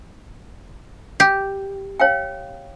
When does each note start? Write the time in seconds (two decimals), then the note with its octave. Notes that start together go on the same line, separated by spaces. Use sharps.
1.20 G4
2.00 C#5 F5 G5